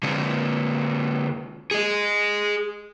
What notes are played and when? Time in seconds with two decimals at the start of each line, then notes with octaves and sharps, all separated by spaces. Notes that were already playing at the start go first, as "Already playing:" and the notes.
0.03 D3 G#3
1.71 G#4 D#5